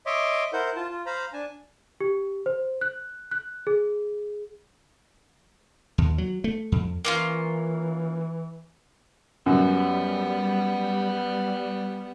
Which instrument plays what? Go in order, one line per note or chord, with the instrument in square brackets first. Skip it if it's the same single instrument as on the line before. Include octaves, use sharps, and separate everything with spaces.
[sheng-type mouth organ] C#5 D#5 E5 C6 D6
E4 A#4 C5 F#5 G6
F4 A5
F4
C5 F5 A#5 B5
D4 G#5 A5
[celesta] G4
C5
F#6
F#6
G#4
[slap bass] D#2
F#3
A3
F2
[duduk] E3 [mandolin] A#3 C#4 F4
[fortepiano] F#2 [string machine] G3 [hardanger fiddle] B3